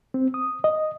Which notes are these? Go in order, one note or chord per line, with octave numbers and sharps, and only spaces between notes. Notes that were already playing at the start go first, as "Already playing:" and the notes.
C4
D#6
D#5